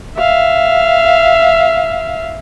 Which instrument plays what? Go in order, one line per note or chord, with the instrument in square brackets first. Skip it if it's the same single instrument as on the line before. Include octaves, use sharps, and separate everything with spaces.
[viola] E5 F5